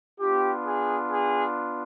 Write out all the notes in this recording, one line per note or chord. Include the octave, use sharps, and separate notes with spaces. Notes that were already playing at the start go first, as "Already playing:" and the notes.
B3 D4 F4 G4
G#4
G#4